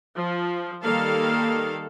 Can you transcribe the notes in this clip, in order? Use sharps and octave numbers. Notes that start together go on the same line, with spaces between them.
F3
D#3 G3 A#3 A4 F5